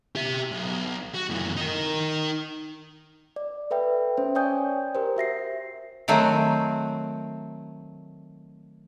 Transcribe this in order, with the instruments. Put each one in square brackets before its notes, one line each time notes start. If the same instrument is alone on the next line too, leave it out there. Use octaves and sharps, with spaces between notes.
[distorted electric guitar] G4 E5
B1
F#4
F#2 E3
D#4 A#4
[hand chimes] D5
A4 B4 E5 G5
C#4 C5
C#5 D5 G5 G#5 D#6 G6
G4 A#4 C5
F#4 E5 A#6 C7
[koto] D#3 F#3 A3 C4